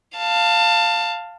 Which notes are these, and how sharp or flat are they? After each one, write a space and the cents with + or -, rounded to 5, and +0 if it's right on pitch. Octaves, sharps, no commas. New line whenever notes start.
F5 +0 A5 +20